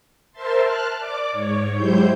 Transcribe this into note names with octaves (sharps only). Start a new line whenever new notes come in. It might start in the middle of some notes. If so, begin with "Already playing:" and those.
A#4 C5 E5 A5 C6
A5 F6 F#6
D5 D6
G#2 C#5
F#3 G#3 E4 G4 C5 G6